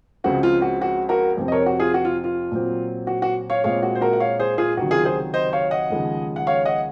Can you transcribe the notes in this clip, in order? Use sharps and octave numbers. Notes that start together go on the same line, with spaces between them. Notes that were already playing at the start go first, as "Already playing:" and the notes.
C#2 C#3 F3 G#3 C4 F#4
F4
F#4
F#4
F#4 A#4
F2 C3 F3 C4
D#5
A#4 C#5
F#4
F4 G#4
F#4
F4
F4
A#2 F#3 C4
F#4
F#4
C#5 F5
A#2 G#3 C4 C#5 F5
F#4
C5
F#4 A#4
F#5
C#5 F5
G#4 C5
F4 G#4
C#2 C3 D#3 F#3 F#4
F4 G#4
G#4 C5
C5 D#5
C#5 F5
D#5 F#5
D#2 C#3 F3 G#3
F#5
C#5 F5
D#5 F#5